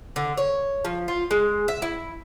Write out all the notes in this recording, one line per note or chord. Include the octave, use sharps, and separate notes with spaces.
D3
C#5
F3
F4
G#3
E5
E4